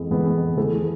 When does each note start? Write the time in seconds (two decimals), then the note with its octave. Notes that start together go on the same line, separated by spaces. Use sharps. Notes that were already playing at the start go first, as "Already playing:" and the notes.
Already playing: F2 E3 G#3 B3
0.10 F2 E3 G#3 B3
0.57 E3 A3 E4 G#4